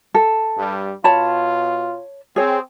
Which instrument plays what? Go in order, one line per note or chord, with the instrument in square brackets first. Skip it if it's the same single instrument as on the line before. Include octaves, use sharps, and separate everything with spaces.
[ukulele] A4
[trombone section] G2 G3
[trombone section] B2 F4 [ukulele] C#5 A5 B5
[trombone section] C4 [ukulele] G#4 C#5